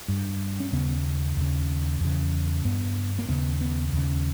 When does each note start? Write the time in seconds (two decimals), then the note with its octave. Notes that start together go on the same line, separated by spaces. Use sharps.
0.08 G2
0.60 C#4
0.72 D#2 C#3 B3
1.37 D#2 C#3
2.01 E2 C#3
2.65 G2 B3
3.19 A#3
3.29 D#2 C#3 B3
3.61 B3
3.93 D#2 C#3